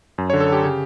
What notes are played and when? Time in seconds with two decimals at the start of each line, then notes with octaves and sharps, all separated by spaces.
0.18 F#2
0.30 D3 C#5
0.40 A4
0.48 D3 G4
0.64 C#3